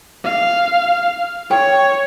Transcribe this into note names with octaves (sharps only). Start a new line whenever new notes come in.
F5
C#5 G5